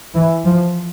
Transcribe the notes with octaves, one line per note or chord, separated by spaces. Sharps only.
E3
F3